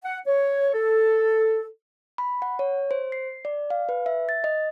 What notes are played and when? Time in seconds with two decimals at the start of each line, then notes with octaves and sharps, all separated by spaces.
0.05 F#5
0.26 C#5
0.73 A4
2.18 B5
2.42 F#5
2.59 C#5
2.91 C5
3.12 C7
3.45 D5
3.70 F5
3.89 B4
4.06 E5
4.29 A6
4.44 D#5